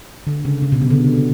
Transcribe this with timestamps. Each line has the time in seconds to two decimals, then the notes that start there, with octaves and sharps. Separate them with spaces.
0.27 D3
0.45 C#3
0.62 C#3
0.72 B2
0.82 C3
0.90 D3